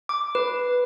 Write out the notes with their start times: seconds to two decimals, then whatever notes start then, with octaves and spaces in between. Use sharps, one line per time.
0.09 D6
0.35 B4